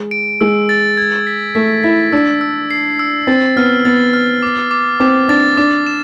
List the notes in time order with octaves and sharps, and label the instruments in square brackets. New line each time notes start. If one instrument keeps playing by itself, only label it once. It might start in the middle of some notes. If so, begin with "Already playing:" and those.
Already playing: [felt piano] G#3
[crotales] D7
[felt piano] G#3 [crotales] E6
[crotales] A6
G#6
B6
[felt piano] A3 [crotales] B6
[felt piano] E4 [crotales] B6
[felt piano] D4 [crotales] E6
[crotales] E6
C7
E6
[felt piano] C4 [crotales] A6
[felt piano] B3 [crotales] F6
[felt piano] B3 [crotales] A6
[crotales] F6
D6
D6
[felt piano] C4 [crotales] D6
[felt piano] D4 [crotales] A6
[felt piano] D4 [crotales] D6
[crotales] E7